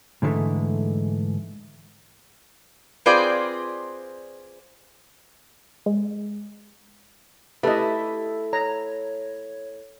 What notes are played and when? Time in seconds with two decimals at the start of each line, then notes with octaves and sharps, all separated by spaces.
0.22 G#2 D3 E3 F3 G#3 A3
3.06 C4 F4 G#4 B4 C5 D5
5.86 G#3
7.63 A3 E4 G4 B4 D#5
8.53 C#5 A#5